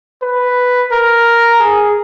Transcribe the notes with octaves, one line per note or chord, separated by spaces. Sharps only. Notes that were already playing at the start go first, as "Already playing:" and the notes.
B4
A#4
G#4